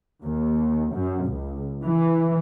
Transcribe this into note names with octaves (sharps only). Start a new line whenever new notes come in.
D#2
F#2
C#2
E3